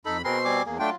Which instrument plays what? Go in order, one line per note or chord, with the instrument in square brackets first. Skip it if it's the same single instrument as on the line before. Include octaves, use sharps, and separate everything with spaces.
[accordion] F2 B5 [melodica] D#4 A4
[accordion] B2 C4 C6 [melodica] G#4 A#4 B4
[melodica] G3 G#5 D6
[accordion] E2 [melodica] A#3 G#4
[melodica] F#3 F4 [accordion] A3 D4 G5